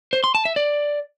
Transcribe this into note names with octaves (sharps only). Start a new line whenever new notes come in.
C5
C6
A5
E5
D5